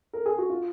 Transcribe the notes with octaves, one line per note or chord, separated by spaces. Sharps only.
A#4
G#4
F#4
F4